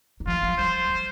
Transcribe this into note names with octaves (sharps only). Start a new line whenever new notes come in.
D#3
F3 F4
F3
G3 C5
F3